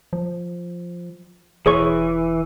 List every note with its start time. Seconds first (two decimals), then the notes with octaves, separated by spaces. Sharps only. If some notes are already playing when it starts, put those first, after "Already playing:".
0.13 F3
1.66 E1 E3 G#4 C#5 C#6